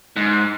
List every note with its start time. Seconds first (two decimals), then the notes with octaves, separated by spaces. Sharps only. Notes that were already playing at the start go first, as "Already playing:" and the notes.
0.16 G#2